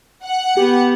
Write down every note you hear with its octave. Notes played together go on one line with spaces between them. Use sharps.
F#5
B3 G4